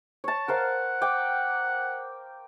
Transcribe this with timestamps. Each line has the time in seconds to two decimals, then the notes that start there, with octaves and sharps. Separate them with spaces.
0.24 C#5 A5
0.48 A#4 C5 F5 F#5
1.01 G5 D6